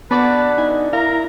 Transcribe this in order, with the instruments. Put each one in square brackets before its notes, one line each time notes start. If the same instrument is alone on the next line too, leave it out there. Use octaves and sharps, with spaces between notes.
[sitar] D3 F#4 D5 [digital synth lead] B3 [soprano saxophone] B4 [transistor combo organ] A5
[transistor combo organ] D#4 [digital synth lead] G#5
[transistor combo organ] E4 A#5 [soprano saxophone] A#4 [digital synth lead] F5